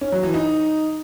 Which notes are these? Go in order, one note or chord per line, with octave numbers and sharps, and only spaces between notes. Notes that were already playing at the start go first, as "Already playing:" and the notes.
C#4
F#3
E3
D#4